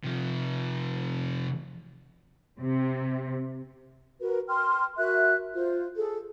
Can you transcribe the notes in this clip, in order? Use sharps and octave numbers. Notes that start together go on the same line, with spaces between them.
C3 F3
C3
F#4 A#4 B4
G5 C6 F6
F#4 A#4 E5 F#6
F4 C5
G#4 A4